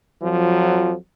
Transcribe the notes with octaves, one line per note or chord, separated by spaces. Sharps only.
F2 F3 F#3